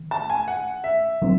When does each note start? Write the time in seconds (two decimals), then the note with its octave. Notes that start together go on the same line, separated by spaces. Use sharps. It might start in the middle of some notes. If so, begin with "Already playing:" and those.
Already playing: D#3
0.11 A5
0.30 G#5
0.48 F#5
0.84 E5
1.22 D#3 F#3 C4